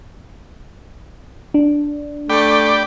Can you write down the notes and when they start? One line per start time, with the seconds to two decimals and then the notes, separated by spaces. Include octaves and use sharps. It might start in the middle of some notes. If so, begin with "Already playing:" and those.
1.54 D4
2.30 A3 D5 G5 B5